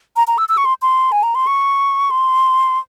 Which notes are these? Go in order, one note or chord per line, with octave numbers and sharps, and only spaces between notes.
A#5
A#5
E6
E6
C#6
C6
C6
G#5
A#5
C6
C#6
C6